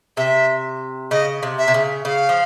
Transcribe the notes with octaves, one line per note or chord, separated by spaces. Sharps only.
C3 E5
C#3 D#5
C3
E5
C3
C#3
C#3 F5
F3